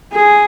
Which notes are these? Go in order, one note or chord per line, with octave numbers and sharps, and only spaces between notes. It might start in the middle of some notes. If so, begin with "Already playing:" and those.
G#4